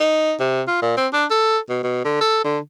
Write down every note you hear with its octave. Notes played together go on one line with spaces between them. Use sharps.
D#4
C3
F4
A#2
C4
D4
A4
B2
B2
D3
A4
D3